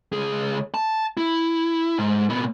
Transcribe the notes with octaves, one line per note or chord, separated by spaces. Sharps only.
C#2 G#4
A5
E4
G#2
A#2 B3